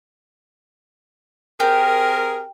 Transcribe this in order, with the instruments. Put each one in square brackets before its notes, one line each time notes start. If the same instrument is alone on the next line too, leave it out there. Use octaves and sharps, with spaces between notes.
[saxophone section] C4 G#4 A#4 [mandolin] G4